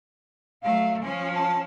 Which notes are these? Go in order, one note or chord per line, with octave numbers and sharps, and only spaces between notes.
F#3 A3 F5
F3 C#4 G#5
A5